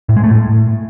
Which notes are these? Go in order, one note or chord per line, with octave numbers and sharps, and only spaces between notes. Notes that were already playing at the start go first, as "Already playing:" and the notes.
A2
G#3
A3
A2